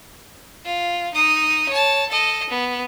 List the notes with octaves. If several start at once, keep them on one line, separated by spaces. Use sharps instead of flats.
F4
D#4 D#6
C#5 A5
A4 D#5
B3